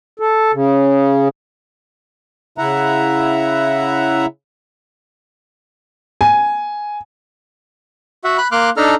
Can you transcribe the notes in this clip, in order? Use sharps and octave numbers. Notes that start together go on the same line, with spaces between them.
A4
C#3
C#3 E4 E5 F#5 A#5
G#5
F#4 E5 F#5
B5 F#6
A#3 C6 D6 F6 F#6
D4 D#4 A4 A#5 F6